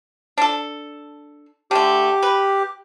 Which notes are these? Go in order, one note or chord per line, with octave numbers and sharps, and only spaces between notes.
D4 A4
D3 A3 G4
B4